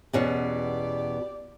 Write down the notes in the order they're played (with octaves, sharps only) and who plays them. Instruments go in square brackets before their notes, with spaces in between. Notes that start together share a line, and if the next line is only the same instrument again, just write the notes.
[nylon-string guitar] E2 B2 C#4 [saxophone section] G4 D5